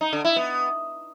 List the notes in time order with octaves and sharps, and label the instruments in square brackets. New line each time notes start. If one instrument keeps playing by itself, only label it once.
[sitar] D#4
D3
E4
B3